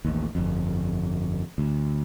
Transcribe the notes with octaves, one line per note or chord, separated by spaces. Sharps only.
A1 D#2
G1 F2
D2